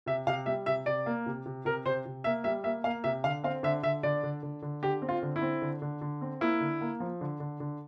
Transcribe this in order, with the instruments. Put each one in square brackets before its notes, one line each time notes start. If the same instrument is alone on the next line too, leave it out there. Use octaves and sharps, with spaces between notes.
[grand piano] C3 E5
C3 F5
G3 E5
C3 E5
C3 D5
A#3
C3
C3
C3 A#4
C3 C5
C3
A#3 E5
G3 E5
A#3 E5
A#3 F5
C3 E5
D3 F5
C4 F5
D3 E5
D3 E5
D3 D5
D3
D3
D3
D3 G4
C4
F4
D3
E4
C4
D3
D3
D3
C4
A#3 E4
D3
A#3
F3
D3
D3
D3